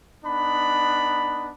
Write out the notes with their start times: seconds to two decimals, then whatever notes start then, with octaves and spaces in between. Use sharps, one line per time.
0.25 B3 D4 D#4 B5